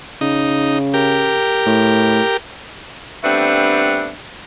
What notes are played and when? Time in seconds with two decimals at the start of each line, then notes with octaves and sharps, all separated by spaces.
0.21 C#3 D#4
0.94 G4 A#4
1.66 A2
3.24 G3 A3 B3 C4 D4